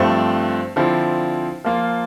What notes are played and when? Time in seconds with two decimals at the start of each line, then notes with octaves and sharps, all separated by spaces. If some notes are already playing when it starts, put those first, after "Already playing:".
Already playing: G2 F3 A3 C4
0.76 D3 F3 C4 E4
1.65 F3 A#3 F4